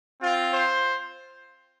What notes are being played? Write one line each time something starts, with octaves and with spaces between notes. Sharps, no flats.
C4 F4
C5